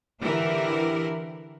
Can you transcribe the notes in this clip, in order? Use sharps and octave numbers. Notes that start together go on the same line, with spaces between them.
D3 E3 E4 G4 A#4